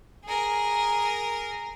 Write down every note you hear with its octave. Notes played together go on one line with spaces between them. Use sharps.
G#4 A#4